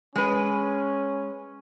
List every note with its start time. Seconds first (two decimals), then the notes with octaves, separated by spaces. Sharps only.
0.16 G#3 C#4 B4